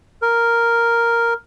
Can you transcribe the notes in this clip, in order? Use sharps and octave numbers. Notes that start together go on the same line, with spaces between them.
A#4